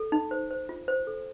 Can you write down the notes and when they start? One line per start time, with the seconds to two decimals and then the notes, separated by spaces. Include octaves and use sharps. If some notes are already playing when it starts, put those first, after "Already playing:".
Already playing: A4
0.12 D#4
0.31 C5
0.51 C5
0.69 F4
0.88 C5
1.07 A4